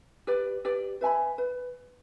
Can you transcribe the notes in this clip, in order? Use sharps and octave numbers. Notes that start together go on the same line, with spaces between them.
G4 B4 D5
G4 B4 D5
B4 E5 G#5 B5
B4